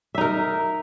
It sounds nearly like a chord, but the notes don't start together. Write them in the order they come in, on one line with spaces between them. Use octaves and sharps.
E5 D#4 A#4